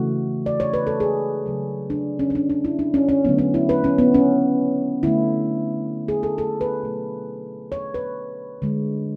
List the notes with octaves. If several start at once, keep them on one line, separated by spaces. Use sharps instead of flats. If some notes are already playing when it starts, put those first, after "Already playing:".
Already playing: C#3 E3 A3 F#4
D5
C#5
B4
A4
G#4
C#3 F#3 A3
D4
C#4
C#4
D4
D4
E4
D4
C#4
C#4
D3 F#3 A3 B3
C#4
E4
B4
C#4
B3
C#4
D3 A3 E4
G#4
A4
A4
B4
B2 F#3 A3
C#5
B4
D3 G#3